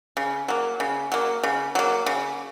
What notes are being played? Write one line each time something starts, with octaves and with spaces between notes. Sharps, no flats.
C#3
F#3 A#3
C#3
F#3 A#3
C#3
F#3 A#3
C#3